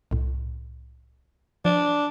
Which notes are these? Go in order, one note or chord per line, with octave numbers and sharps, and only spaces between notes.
C2 A2
F3 D4